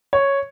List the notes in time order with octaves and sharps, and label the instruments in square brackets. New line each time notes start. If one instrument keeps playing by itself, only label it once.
[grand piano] C#5